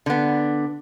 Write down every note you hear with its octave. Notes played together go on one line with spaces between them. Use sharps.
D3 B3